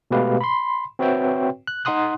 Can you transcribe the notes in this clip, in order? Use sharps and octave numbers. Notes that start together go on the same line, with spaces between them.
B2 G#3 A3 G4 B4 F5
B5 C6
C4 F#4 B4 C#5 E5 G5
F#6
D#4 F#5 C6 D#6 F#6